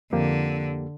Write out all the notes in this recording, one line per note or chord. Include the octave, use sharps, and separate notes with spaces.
F2 D3 A#3 G4